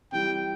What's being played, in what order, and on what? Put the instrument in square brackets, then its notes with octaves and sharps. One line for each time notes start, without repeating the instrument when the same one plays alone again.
[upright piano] C3 E3 G3 [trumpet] G5